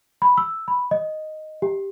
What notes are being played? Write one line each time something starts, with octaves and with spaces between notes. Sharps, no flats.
B5
E6
B5
D#5
G4